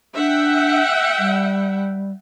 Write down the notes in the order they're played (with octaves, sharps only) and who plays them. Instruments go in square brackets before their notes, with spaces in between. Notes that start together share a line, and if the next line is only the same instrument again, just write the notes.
[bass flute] D4 [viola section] E5 F#5 G5
[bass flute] G3